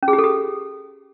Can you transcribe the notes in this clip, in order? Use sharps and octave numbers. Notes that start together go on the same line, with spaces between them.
C#4
G#4
G4
A4
G4